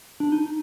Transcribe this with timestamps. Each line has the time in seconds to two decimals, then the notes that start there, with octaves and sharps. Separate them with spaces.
0.20 D4
0.32 D#4